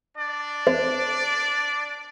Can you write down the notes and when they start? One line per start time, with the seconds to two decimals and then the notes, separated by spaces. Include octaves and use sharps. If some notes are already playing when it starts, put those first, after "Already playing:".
0.16 D4 D5
0.67 C5